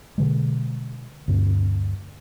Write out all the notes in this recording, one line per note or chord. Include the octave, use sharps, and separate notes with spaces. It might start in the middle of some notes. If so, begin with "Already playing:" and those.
B2 D3 G#3
D2 G2 C4